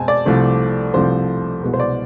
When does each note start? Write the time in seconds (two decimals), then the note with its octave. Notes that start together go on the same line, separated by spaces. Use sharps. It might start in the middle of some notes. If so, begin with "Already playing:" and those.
Already playing: B2 G#3 C4 G#5 A5
0.08 D5
0.25 C2 C3 F3 A3 C4
0.94 C2 C3 F3 A3 C4 C5
1.63 C2 B2 G#3 B3
1.73 C5
1.80 D5